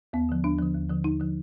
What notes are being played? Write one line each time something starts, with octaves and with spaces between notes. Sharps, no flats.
D#2 B3
D3 F3
D#2 D4
D3 F3
D#2
D3 F3
D#2 D#4
D3 F3